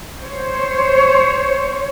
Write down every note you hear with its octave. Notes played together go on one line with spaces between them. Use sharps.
C5 C#5